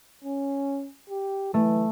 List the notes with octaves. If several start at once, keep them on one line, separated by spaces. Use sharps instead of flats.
C#4
G4
E3 A3